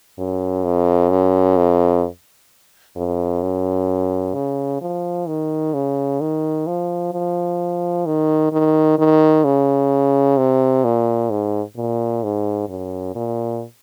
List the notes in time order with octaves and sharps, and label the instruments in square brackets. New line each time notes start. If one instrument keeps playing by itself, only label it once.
[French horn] F#2
F2
F#2
F2
F2
F#2
C#3
F3
D#3
C#3
D#3
F3
F3
D#3
D#3
D#3
C#3
C3
A#2
G#2
A#2
G#2
F#2
A#2